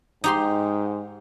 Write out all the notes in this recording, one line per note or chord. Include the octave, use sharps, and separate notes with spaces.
G#2 D#4 G4 C6